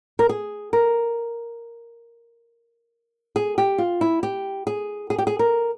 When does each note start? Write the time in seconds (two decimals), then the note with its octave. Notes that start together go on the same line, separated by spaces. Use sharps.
0.19 A#4
0.29 G#4
0.73 A#4
3.36 G#4
3.58 G4
3.78 F4
4.01 E4
4.23 G4
4.67 G#4
5.10 G#4
5.18 G4
5.27 G#4
5.39 A#4